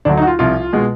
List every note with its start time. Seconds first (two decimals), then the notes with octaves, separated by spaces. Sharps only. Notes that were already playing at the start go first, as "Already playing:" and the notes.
0.05 D2 D3 F#3 D4
0.17 D#4
0.22 F#4
0.27 F4
0.39 C2 C3 F3 F4
0.73 B2 G#3